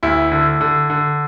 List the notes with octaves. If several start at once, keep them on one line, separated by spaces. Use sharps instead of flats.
D2 E4
D3
D3
D3